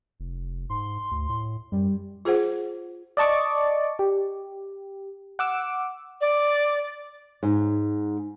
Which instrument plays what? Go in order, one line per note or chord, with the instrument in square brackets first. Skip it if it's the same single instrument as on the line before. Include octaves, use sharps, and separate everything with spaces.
[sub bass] F1
[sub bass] G#2 [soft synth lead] C6
[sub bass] D2
A2
[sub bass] F#2 [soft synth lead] G3
[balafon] F4 G#4 C5 F#5
[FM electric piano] D5 D#5 A5 C#6 D6
G4
F#5 D6 E6
[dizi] D5
[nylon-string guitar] G#2